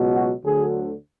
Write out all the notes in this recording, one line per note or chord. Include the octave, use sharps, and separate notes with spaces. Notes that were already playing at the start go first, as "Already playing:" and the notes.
Already playing: C#2 B2 F#3
F#4
D2 D3 F#3 G#4